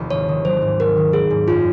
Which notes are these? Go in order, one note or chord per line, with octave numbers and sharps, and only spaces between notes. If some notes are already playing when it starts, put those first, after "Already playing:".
Already playing: F1 D#2 D#3
G#1 C#5
D#3
F#3 C5
G#2
G#1 A#4
D#3
F#3 G#4
G#2
F#2 F4